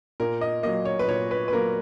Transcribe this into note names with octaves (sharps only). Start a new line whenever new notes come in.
A#2 A#4
D#5
F#3 A#3 D#5
C#5
B4
A#2 C#5
B4
B4
F#3 A#3 A#4